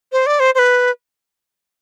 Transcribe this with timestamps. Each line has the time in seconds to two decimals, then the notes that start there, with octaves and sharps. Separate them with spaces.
0.12 C5
0.26 D5
0.40 C5
0.55 C5
0.59 B4